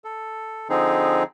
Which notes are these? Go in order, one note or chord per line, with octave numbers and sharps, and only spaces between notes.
A4
D3 F3 C4 D#4 G#4